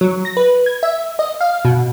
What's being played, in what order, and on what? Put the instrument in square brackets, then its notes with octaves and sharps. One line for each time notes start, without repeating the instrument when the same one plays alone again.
[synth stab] F#3
A#6
B4
G#6
E5
D#5
F5
B2